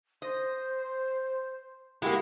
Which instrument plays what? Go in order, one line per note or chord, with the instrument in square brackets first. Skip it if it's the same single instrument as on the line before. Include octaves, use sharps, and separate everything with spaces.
[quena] C5 [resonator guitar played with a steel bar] D#5
[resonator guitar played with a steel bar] G#3 A#3 [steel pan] E4 F#4 G4 [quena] B5